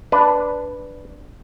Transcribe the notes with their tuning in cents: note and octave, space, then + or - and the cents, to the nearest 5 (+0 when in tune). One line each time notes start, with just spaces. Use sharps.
D4 +0 B4 +0